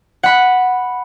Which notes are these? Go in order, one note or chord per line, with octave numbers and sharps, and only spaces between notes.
F#5 B5